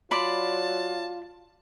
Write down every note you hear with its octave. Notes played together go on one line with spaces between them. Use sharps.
F#3 F4 D5 A5 B5 C6